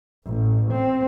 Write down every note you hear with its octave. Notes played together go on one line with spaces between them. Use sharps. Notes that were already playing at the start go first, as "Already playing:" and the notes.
A1
C4